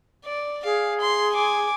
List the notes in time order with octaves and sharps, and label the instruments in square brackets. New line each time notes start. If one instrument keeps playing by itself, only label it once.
[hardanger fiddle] D5
[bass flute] G#4 [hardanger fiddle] F5
[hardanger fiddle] C6
G#5 D6